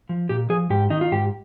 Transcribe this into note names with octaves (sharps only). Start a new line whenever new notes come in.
F3
A#2 G4
F3 G#4
G#2 G4
D#3 D#4
F4
G#2 G4